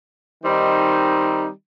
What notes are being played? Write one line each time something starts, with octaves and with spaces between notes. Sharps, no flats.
D#3 G3 C4 D#4